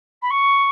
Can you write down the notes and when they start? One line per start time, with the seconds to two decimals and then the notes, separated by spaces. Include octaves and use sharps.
0.22 B5
0.30 C#6